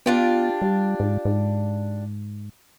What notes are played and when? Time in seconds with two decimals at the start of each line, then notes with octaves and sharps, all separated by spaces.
0.06 B3 D4 F4 G4
0.62 G3
1.00 G#2
1.25 G#2